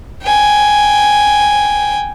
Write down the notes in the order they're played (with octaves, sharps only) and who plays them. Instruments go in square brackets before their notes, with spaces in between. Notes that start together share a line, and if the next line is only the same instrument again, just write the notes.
[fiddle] G5 G#5